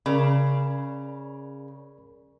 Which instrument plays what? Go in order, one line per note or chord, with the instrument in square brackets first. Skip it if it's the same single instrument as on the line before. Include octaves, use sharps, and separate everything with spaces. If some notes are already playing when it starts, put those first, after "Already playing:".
[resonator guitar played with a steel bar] C#3 [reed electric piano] A#4 D5 B5